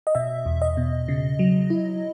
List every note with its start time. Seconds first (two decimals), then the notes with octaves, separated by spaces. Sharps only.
0.07 D#5
0.15 B2 E5
0.46 E2
0.62 D#5
0.77 B2
1.08 C#3
1.39 F#3
1.70 E4